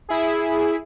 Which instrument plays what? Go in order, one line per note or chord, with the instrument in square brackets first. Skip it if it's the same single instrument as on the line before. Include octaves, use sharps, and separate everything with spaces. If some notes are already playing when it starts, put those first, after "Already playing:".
[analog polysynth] E4 G#4